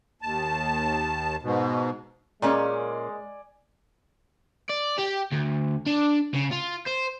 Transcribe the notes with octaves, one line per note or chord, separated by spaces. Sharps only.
D#2 A5
G#2 B2
A#2 G#3 A#3 C#4 D5 G#5
D5
G4
D2
D4
C#3
F4
C5